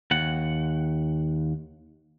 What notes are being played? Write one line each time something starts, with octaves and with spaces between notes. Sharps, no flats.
D#2 F#5